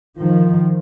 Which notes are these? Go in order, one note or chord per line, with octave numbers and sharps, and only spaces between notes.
D#3 F3